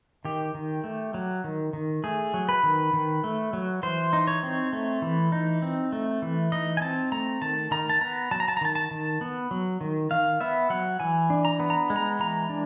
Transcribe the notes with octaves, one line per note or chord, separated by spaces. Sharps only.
D#3 G4
D#3
A3
F#3
D#3
D#3
A3 G#4
F#3
B4
D#3
D#3
A3
F#3
E3 C5
D#4
C#5
C4
A3
E3
D#4
C4
A3
E3
D#4 D#5
G#5
C4 A5
A3 A#5
D#3 A5
D#3 A#5
A5
B3 A#5
F#3 A5
A#5
A5
A#5
D#3 A5
A5
D#3
B3
F#3
D#3
D#3 F5
B3 E5
F#3 F#5
E3 G#5
D4
A#5
B3
A#5
G#3
A#5
E3 A#5
D4